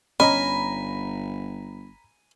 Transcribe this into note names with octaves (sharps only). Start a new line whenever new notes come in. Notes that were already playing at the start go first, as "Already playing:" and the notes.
G1 C#4 D#5 G#5 A#5 B5